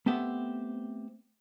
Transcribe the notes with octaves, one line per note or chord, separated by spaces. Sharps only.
A3 B3 C4 G4 E5 F#5